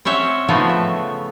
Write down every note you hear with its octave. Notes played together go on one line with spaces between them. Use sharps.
C4 C#4 C#5 E5 F#5
C#3 F3 A3 B3 D#4
E5